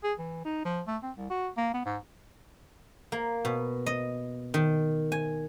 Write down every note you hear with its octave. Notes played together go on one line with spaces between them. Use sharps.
G#4
E3
D#4
F3
A3
C4
C2
F#4
A#3
B3
G#2
A#3
B2
D#5
D#3
G#5